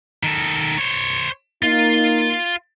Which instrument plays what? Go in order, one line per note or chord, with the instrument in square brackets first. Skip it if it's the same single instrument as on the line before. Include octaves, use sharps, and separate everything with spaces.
[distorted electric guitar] D#3 A4
C5 C#5
[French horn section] A#3 D#4 [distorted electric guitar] F4